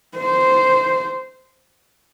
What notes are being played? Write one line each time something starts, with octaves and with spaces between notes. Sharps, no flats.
C5